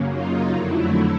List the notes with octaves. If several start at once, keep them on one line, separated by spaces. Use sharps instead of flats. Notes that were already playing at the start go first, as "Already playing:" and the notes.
Already playing: F#2 C#3 F#3 A#3
D#4 F4
F2 D3 F#3 A3 E4